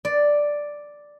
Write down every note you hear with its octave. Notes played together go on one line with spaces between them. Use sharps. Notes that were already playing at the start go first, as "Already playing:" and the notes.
D5